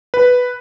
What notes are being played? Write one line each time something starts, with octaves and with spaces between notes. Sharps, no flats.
B4